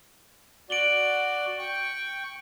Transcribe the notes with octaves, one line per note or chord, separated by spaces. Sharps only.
F#4 D5 D7 F#7 G7
G5 C#6